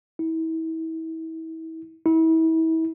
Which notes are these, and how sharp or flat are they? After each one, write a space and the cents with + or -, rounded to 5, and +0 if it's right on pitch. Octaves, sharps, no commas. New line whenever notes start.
E4 -35
E4 -35